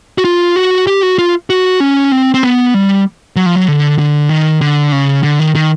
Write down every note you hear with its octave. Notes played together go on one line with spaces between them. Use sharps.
F#4
F4
F#4
G4
F#4
F4
F#4
C#4
C4
C4
B3
G3
F#3
F3
F#3
D3
D3
D#3
D3
C#3
D3
D#3
D#3